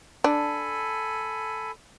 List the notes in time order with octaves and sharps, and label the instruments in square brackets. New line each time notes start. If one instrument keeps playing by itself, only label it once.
[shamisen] D4 [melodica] A4 G#5 B5